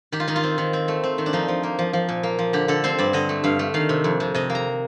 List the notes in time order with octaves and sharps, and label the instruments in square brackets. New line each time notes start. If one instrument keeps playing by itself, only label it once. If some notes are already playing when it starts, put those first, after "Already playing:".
[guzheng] D#3 G4
F4
D#3 D#4
F4
C4
D#3
C4
A3
C4
D#3
D4
F3 D#4
F3
A#3
F3
F3
A#2
A#3
F3
D3 G4
D3 A4
C4 C5
G2 D5
D3 D#5
A3
G2 F5
A3
D#3 F5
C3
F2
C3
C3 D#5
A#3
A#5